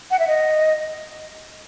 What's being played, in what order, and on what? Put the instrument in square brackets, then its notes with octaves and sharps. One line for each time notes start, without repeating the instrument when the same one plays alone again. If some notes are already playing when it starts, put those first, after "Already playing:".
[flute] F#5
E5
D#5